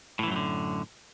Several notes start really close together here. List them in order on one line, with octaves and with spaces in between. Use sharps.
A2 E3 F#2 F#3 D3